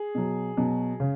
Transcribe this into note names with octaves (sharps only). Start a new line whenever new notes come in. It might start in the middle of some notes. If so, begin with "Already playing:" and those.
Already playing: G#4
B2 F#3
B2 F#3
C#3